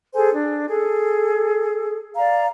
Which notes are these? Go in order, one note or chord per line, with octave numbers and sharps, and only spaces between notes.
G#4 A4 C5 G#5
D4
G#4 A4
D5 F5 A#5